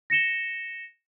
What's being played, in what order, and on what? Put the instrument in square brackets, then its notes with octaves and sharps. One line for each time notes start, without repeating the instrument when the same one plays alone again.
[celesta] A#6 C#7 E7 G7